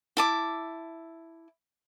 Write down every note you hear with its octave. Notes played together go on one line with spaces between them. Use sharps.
E4 A5 D6